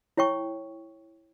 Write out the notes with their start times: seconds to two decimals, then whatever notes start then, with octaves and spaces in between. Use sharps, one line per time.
0.17 E4 C#5 G5 C#6